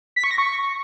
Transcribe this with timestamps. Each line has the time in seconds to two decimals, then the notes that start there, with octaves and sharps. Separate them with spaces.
0.16 B6
0.24 C#6
0.31 A#6
0.38 C#6